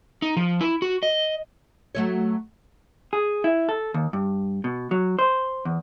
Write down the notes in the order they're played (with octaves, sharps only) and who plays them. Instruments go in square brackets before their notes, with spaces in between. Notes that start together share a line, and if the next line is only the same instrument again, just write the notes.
[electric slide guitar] D#4
F3
E4
F#4
D#5
[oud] F#3 A3 C#5
[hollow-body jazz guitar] G#4
E4
A4
D#2
G2
B2
F#3
C5
E2